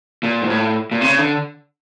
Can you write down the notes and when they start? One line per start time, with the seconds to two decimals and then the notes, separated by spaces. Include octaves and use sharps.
0.23 A#2
0.42 G#2
0.50 A2
0.91 A#2
1.01 C3
1.05 C#3
1.19 D3